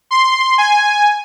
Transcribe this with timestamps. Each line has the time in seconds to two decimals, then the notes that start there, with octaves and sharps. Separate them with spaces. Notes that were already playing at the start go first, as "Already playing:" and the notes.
0.11 C6
0.58 G#5